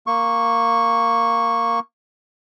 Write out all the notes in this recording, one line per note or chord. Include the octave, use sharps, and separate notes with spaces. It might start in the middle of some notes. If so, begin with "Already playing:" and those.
A#3 C#6